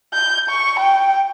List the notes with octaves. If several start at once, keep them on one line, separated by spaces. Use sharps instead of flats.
G6
C#6
G5